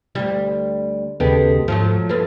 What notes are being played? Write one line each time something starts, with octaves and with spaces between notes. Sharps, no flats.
D2 G3
D#2 C#3 G#3 B3 G4 A4
G#2 F3 F#3 A3
G2 B3 A4